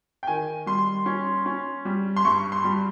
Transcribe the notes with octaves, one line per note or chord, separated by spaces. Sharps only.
G5
D#3 G#5
G3 C6
C#4
C#4
G3
C6
G2 C#6
C6
G3